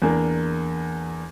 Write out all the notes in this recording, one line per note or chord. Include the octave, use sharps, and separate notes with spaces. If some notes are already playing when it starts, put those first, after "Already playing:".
E2 A#3 D4